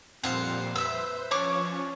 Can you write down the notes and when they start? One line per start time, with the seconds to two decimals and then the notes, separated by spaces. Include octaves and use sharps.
0.23 F2 A#2 G3 C4 C5 F5 F#5
0.76 B4 C5 E5 E6
1.31 F3 C#4 D4 C#5 C#6 D6